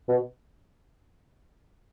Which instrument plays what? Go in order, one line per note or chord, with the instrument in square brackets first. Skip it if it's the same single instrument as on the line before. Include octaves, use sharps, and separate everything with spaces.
[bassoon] B2